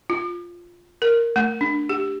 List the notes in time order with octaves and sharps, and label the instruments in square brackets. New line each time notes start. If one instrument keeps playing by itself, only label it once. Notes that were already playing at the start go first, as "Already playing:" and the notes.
[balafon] F4
A#4
A3
D4
G4